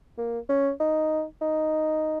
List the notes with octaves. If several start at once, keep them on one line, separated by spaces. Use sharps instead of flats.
A#3
C#4
D#4
D#4